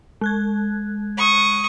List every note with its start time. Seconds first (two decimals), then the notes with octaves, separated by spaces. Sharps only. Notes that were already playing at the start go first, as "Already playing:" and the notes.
0.21 G#3 F#6 G#6
1.18 C#6 D#6